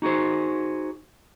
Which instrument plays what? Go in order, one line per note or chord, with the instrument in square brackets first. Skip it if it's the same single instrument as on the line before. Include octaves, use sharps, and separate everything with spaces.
[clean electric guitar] D#4 F#4 G#4 C5